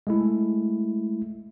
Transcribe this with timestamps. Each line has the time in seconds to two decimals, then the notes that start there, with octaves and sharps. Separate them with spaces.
0.07 G#3 A3 E4